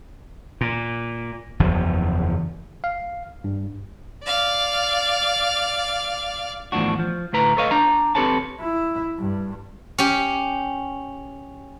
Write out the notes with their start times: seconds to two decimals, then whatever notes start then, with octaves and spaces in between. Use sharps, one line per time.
0.61 A#2
1.59 F#1 E2 F3
2.84 F5
3.44 G2
4.24 D5 F5
6.72 E2 A2 C3 F3 D4 F#4
6.99 F3
7.33 D2 A2 B4 A#5
7.57 A4 B4 C#5 D#5 F5
7.71 D4 A#5
8.15 C4 G4 A4 B4 C#5 A5
8.60 E4
9.19 G2
9.98 C#4 G4